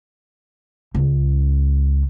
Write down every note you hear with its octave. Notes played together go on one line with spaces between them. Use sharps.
C#2